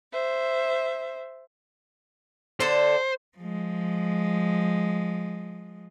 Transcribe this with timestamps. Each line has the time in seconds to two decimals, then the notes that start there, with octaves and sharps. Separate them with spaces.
0.12 C5 E5
2.60 D3 D4 A4 C5
3.38 F3 G#3